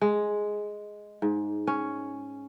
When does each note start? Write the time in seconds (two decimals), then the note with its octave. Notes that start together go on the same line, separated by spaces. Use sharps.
0.01 G#3
1.22 G#2
1.67 C#4